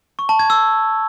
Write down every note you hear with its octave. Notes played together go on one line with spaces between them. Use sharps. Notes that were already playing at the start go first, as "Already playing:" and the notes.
C#6
A5
G#6
E6